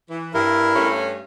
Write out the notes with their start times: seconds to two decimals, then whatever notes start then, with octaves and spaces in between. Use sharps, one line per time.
0.10 E3
0.34 G2 E4 A#4
0.76 G2 A3 C#4